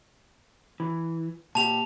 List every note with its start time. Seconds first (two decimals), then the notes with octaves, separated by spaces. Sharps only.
0.80 E3
1.55 A#2 G4 A5 F7